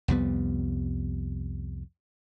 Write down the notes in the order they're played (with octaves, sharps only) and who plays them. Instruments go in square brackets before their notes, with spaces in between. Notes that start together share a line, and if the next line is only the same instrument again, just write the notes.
[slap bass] C2 F2 G3 B3